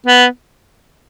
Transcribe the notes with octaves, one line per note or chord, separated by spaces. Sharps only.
B3